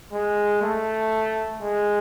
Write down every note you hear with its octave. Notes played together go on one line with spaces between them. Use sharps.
G#3
A3
G#3